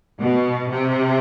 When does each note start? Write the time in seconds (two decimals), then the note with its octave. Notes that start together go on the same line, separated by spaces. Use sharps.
0.19 B2
0.70 C3